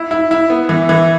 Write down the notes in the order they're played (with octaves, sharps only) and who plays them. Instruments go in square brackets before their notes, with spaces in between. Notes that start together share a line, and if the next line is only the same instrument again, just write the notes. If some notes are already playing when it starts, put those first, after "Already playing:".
Already playing: [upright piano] E4
E4
E4
B3
E3
E3